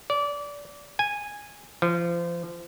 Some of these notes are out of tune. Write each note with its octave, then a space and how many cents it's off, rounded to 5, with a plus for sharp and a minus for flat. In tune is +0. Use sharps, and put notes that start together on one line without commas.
D5 -25
G#5 -10
F3 -30